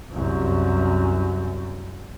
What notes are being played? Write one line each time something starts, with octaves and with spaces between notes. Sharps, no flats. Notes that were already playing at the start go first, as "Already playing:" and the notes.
C2 F#2